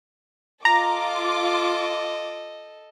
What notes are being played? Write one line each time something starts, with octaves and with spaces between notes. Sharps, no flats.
F4 A4 D#5 A#5 D6